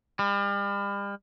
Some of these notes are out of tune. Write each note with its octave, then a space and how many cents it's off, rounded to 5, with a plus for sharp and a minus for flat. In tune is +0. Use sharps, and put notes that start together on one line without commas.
G3 +40